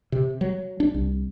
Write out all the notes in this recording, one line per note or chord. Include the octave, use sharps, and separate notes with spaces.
C3
F#3
D4
C2